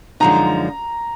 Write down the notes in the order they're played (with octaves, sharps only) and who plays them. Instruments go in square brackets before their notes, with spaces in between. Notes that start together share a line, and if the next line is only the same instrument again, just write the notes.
[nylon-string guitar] F#2 D3 F3 G#3 D#4 [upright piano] A#5